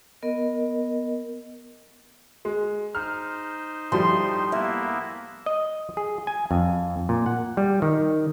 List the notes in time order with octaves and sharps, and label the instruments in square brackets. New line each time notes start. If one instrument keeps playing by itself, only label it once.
[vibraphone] B3 A#4 D#5
[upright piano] G#3
[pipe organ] D#4 C5 [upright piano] F6
[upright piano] A2 F3 G3 [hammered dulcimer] C6
[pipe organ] A#3 B3 E4 [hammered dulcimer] E5
[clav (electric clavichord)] D#5
G#4
G#5
F2
A#2
F#5
G3
D#3